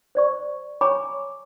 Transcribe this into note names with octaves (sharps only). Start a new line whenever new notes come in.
C5 D5 C#6
C#5 G#5 A#5 B5 C#6 D6